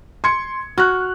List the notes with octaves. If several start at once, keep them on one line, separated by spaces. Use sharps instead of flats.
C6 G#6 C#7
F#4 F6 F#6